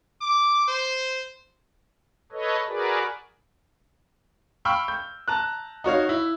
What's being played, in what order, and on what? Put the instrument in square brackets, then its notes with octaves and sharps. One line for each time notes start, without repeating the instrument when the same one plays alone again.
[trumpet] D6
C5
[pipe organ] A4 B4 C#5 D#5
F#4 G#4 A#4 B4 D5
[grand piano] F5 G5 B5 C#6 E6 F6
G6
A5 A#5 F#6
D#4 F#4 C#5 F5
E4